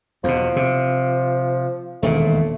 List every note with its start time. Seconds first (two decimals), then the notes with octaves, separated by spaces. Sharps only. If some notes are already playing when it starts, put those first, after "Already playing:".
0.24 E2 B2 F3
0.56 C3
2.03 E1 D#2 A#2 A3